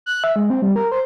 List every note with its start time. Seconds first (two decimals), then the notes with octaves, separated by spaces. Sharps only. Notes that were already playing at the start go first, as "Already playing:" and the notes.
0.06 F#6
0.24 E5
0.36 G#3
0.50 C4
0.62 G3
0.76 A#4
0.92 C5